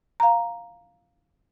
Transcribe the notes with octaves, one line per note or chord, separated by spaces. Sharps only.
F5 A#5